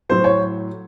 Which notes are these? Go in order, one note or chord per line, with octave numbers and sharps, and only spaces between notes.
A2 F#3 C5
C#5